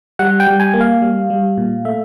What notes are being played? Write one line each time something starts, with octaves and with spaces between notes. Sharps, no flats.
G3 F#5
G5
G3
G#5
A#3
F5
G3
G3
A#2
A3 E5